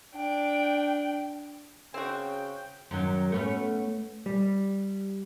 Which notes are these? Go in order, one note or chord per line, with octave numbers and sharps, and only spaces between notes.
D4 G5
C#3 C4 F#4 G5
F#2 D#3 F#3
A3 B3 C#4
G3